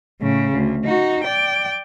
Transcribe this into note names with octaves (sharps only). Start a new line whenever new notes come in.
A2 C#3
D2
D#4 F#4
D5 G5